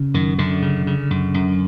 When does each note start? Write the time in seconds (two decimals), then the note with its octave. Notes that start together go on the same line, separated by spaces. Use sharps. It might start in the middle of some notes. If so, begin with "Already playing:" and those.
Already playing: C#3
0.14 F#2 D#3
0.38 F#2 D3
0.62 C#3
0.87 C#3
1.10 F#2
1.34 F#2